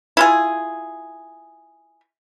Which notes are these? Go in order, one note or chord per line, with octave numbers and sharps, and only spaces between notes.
E4 F4 G#4